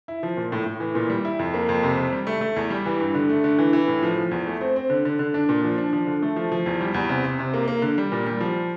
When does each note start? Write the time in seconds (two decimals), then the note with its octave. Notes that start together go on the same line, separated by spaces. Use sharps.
0.08 E4
0.23 F3
0.37 A#2
0.52 A2
0.66 A2
0.80 E3
0.95 A#2
1.10 G3
1.25 E4
1.39 F2
1.54 A#3
1.69 F2
1.83 C3
1.97 C3
2.13 G3
2.27 A3
2.41 A3
2.56 E2
2.70 G3
2.86 E3
3.00 G2
3.15 D3
3.29 A3
3.44 D3
3.59 E3
3.73 E3
3.88 A2
4.03 F3
4.18 F3
4.31 E2
4.47 A3
4.61 C4
4.76 C4
4.90 D3
5.05 D3
5.19 D3
5.34 D4
5.49 A#2
5.64 F3
5.78 D4
5.93 F3
6.07 D3
6.22 A3
6.36 F3
6.52 F3
6.66 E2
6.81 G3
6.94 E2
7.09 C3
7.24 C3
7.39 C3
7.54 A#3
7.68 A#3
7.82 D3
7.98 G3
8.12 A#2
8.27 G3
8.40 F3